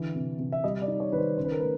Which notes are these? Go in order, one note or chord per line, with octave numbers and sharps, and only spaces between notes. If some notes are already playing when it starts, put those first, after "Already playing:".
Already playing: D3 E3
C3
C3
E5
G3 D#5
D5
D#4
C#5
D#3 B4
C5
C#3 C5
B4
A#4
A3 B4